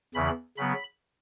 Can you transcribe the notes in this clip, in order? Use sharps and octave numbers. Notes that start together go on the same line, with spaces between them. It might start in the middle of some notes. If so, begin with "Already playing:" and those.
E2 C#3 E3 B5
C#3 F#3 B3 B5